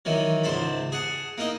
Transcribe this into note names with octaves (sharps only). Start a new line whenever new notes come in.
D#3 E3 F#3
C#2 G#2 C5 A5 B5
G#4 F#5 A5
A#3 D#4 E4 D#5